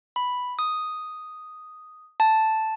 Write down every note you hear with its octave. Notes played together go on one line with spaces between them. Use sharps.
B5
D#6
A5